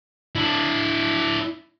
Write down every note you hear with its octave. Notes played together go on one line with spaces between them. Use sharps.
D4 E4